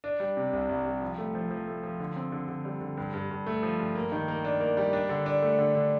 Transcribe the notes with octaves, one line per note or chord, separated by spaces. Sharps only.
D4
G3
C3
C2
C2
G3
F3
A3
F3
F3
A3
F3
D3
C4
D3
D3
G3
D3
G2
G2
G2
A3
F3
G2
A#3
D#3
A#3
D4
A#3
G3
D4
D3
D4
A3
D3
D3